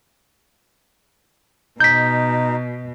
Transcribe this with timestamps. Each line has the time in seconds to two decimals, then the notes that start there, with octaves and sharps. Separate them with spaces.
1.80 B2 D#4 G6 B6